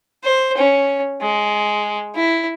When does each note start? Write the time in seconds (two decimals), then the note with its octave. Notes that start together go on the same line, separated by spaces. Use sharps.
0.24 C5
0.57 C#4
1.22 G#3
2.15 E4